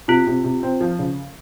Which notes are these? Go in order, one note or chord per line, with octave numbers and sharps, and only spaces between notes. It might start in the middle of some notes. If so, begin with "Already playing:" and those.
C3 F4
C3
C3
C4
F3
C#3